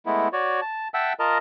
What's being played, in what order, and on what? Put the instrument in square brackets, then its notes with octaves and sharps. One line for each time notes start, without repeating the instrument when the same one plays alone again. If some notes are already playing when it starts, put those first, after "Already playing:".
[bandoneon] G#3 A3 B3 E4
F#4 C#5 D5
A5
E5 F#5 G5 A5 E6
F4 A#4 D#5 A5 A#5